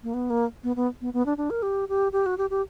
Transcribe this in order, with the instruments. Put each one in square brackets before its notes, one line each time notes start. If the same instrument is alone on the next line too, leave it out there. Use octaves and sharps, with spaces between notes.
[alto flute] A#3
B3
A#3
B3
B3
B3
B3
D4
D4
A#4
G4
G4
G4
F#4
G4
G4